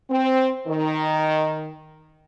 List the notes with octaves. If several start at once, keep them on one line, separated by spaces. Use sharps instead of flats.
C4
D#3